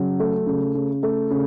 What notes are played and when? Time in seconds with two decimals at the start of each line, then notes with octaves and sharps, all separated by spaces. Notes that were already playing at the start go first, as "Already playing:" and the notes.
Already playing: C#3 F#3
0.20 A3
0.47 C#3
0.75 C#3
1.03 A3
1.31 C#3